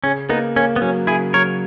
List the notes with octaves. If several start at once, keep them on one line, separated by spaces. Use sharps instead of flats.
C#3 C#4
A#3 B3 D#4
A#3 C#4
B3
F#3 C#4
C#3 E4 G#4
F#3 A#4 C#5